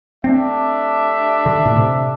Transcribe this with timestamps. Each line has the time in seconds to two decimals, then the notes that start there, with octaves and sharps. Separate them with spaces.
0.24 A3 C4 D4 G4 E5
1.46 D3
1.66 A2
1.76 C3